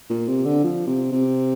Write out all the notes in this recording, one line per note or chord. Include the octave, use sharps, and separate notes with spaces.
A#2
C3
D3
F3
C3
C3